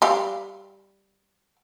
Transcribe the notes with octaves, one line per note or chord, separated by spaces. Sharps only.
G3 G4 F5